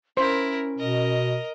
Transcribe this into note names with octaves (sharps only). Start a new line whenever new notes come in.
C#4 E4 A#4 C5
B2 A#4 D#5